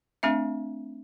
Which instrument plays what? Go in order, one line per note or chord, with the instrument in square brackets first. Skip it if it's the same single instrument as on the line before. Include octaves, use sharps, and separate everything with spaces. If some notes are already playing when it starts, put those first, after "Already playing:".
[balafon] A3 C4 D4 E5